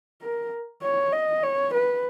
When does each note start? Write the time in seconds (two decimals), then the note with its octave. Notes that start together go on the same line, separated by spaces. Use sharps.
0.22 A#4
0.82 C#5
1.12 D#5
1.43 C#5
1.74 B4